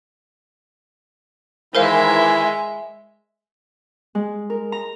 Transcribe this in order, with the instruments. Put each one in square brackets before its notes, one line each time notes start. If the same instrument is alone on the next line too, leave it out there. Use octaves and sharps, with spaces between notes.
[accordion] D#3 E3 E4 [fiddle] G#3 E5 [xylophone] A#4 C5 F5
[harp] G#3
A#4
A#5